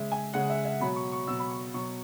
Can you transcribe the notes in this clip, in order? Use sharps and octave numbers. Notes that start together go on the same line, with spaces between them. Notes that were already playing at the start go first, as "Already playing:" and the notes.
Already playing: C#3 G#3 E5
G#5
C#3 G#3 F#5
E5
E5
B2 F#3 B5
C#6
C#6
B2 F#3 E6
B5
C#6
B2 F#3 C#6